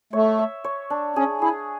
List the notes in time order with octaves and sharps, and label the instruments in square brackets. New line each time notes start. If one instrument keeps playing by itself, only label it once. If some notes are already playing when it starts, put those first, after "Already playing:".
[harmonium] A3 [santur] C#5
[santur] E5
C#5
D4
[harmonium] C#4 [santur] G#4
[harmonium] E4 [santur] G#4